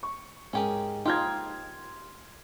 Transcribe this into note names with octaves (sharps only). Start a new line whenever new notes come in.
C#6
G#2 C#4 G4 G#4 A#4
D#4 F4 G4 G5 C6 F6 G#6